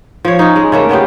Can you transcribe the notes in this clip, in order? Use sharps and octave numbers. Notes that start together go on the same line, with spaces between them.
F3 C#5
C#4 D#4
G#3
C#3 A3 A#3
C#3 B3 F4 G4